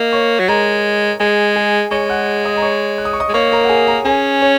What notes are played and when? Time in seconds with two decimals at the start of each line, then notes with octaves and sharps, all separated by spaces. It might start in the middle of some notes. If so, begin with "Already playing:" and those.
Already playing: A#3 D#5
0.13 C#5 C#6
0.39 F#3
0.48 G#3 A#4 A#5
1.20 G#3 G#4 G#5
1.56 G#4 G#5
1.91 G#3 C#5 C#6
2.09 F#5 F#6
2.45 D#5 D#6
2.56 A#5
2.62 C#5 C#6
2.98 F#6
3.05 D#6
3.13 C#6
3.20 D#5 D#6
3.29 G#3
3.34 A#3 C#5 C#6
3.52 A#4 A#5
3.64 F#5
3.69 G#4 G#5
3.87 A#4 A#5
4.05 C#4 G#4 G#5
4.42 C#5